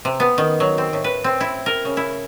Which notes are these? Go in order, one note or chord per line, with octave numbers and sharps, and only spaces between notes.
C3
B3
D#3
F#3
C4
A2
B4
C4
E4
A#4
C#3
E4